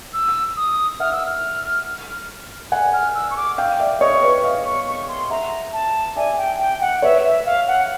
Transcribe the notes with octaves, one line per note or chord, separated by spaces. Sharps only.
E6
D#6
E5 F#5 F6
E6
F6
F#5 G#5
F6
E6
C#6
D6
F5 G5
D5 E5
C#5 D#5 C#6
B4 C#5
D#5 F5
C#6
C#6
C6
E5 F#5 A#5
A5
D5 E5 G#5
G5
G5
F#5
B4 C#5 E5
E5
F5
F#5